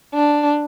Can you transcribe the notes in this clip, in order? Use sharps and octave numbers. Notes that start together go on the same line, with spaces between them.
D4